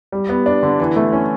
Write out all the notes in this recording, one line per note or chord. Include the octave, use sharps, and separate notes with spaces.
G3
B3
D4
D3
E3
A3
C#4